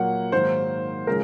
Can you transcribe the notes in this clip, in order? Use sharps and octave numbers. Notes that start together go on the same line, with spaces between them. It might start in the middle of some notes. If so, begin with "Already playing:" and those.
Already playing: A#2 F#3 A#3 F#5
G#2 D#3 F#3 A#3 C5
C#3 F3 G#3 A#4